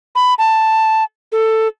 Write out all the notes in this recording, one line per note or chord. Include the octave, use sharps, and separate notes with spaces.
B5
A5
A4